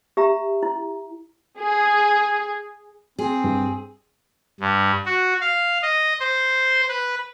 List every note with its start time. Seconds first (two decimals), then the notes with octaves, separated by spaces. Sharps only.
0.17 G4 E5 A#5
0.63 E4
1.59 G#4
3.19 C4 G#4
3.44 G2
4.60 G2
5.06 F#4
5.41 F5
5.83 D#5
6.20 C5
6.89 B4